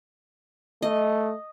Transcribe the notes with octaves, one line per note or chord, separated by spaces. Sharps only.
A3 D#5